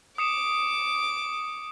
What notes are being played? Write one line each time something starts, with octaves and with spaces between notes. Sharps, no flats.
D6 D#6 C#7 E7